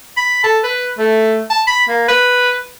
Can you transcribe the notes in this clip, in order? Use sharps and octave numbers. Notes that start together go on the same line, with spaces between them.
B5
A4
B4
A3
A5
B5
A#3
B4